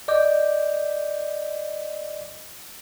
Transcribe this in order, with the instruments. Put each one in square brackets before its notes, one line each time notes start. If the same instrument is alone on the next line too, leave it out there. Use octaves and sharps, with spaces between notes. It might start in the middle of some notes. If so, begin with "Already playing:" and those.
[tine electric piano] D5 D#5 D6 G6